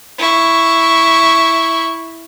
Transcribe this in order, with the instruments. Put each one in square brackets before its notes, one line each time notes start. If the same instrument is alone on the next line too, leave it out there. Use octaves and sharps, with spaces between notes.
[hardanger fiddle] E4 C#6